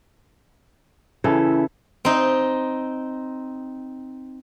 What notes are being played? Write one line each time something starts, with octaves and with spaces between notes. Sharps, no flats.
C#3 E3 E4 A4
C4 D#4